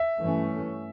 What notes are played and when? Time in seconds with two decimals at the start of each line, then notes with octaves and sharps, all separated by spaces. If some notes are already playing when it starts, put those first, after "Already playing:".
Already playing: E5
0.19 G2 E3 A3 C#4